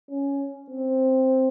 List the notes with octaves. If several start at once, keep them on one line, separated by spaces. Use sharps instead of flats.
C#4
C4